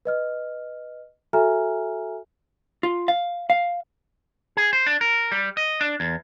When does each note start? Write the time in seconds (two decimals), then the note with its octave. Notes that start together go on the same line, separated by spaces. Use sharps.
0.05 B4 D#5 F6
1.33 F#4 A4 E5 G#5 A#5 F6
2.83 F4
3.08 F5
3.50 F5
4.57 G#4
4.73 C5
4.87 D4
5.01 A#4
5.32 G3
5.57 D#5
5.81 D4
6.00 E2